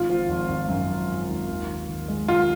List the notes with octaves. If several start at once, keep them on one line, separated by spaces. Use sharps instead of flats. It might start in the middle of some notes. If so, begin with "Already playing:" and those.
Already playing: G#1 F4
F3
G#1
G#1
F#2
G#1
G#1
G#1
D#2
D#3
D#2
G#3
D#2 F4